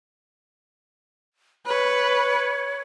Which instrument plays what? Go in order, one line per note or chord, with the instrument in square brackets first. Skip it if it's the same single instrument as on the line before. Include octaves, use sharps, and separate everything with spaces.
[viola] B4 [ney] C#5